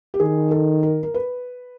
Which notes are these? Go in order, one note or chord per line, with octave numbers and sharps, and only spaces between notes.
G4
D#3 G#4
A4
A#4
A#4
B4